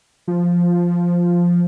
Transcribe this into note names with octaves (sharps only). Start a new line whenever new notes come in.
F3